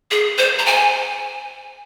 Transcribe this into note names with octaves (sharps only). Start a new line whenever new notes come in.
G#4
C5
A#5
G#5